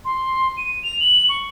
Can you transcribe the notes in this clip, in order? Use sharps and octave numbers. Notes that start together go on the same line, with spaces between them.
C6
D#7
F7
F#7
C#6